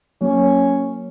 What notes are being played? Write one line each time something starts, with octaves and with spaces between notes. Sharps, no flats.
F#3 A#3 C#4